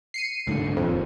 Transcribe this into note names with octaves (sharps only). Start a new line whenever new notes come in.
C7 C#7 D#7
C2 G#2 D3
D#1 F2